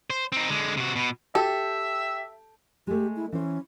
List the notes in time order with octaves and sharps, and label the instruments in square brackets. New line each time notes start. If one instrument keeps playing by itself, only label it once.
[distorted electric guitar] C5
C4 D#4
D3 G#3
C3 F#4
B2
[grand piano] G4 [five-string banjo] A4 [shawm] E5
[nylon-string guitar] G#3 A3 [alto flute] G4
[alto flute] E4
[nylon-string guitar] E3 C5 [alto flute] C#4